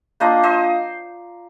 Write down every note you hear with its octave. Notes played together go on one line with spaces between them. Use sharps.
A#3 D4 F4 C5 D#5
C5 D#5